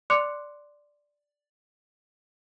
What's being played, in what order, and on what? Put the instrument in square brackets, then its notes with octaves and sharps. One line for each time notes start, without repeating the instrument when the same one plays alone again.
[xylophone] D5 C6 D6 F#6 C#7 F7